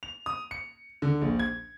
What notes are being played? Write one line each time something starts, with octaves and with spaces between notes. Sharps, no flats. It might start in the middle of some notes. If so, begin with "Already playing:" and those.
F7
D#6
C#7
D3
A#1
G#6